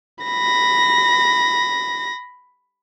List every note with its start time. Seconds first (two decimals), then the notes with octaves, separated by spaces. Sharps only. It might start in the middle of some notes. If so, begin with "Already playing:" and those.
0.24 B5 A#6